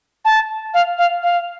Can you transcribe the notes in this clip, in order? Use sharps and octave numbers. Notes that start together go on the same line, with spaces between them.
A5
F5
F5
F5